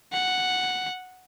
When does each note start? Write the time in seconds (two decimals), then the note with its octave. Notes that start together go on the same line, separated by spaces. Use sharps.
0.13 F#5